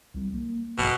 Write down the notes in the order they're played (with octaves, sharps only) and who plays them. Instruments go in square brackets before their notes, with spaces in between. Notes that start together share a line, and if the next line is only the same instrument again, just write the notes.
[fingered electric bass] C2 G3
A#3
[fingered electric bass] A#1 G2 [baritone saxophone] B2